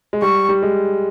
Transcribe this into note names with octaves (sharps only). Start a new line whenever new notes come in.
G#3
G3 C#6
G3
G#3